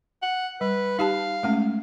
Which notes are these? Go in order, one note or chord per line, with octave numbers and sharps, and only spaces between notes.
F#5
G3 B4
D#4 G4 F5 A5
G#3 A3 C#4